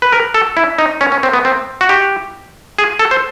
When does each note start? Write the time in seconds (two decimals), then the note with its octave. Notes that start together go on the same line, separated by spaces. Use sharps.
0.02 B4
0.12 A#4
0.34 A4
0.57 E4
0.79 D#4
1.01 C#4
1.12 C#4
1.23 C4
1.33 B3
1.45 C4
1.81 F#4
1.89 G4
2.79 G#4
2.99 A4
3.11 C5